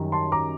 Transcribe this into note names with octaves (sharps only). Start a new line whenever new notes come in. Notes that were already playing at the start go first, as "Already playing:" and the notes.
Already playing: F#2 D#3 G3
A5 C6
A#5 D6